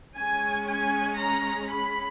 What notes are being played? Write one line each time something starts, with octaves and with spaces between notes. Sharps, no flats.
G#3 C#4 G#5
G#5
A#5
B5